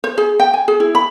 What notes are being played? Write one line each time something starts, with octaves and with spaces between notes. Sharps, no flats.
C5
G#4
G5
G#5
G#4
E4
B5